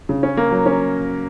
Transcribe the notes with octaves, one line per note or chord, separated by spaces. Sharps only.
C#3
C#4
A#3
F#3
C#4